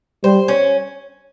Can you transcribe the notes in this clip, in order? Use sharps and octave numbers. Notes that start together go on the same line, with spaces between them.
G3 C5
C#4